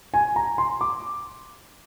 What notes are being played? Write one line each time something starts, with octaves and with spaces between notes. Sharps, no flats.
G#5
A#5
C6
D6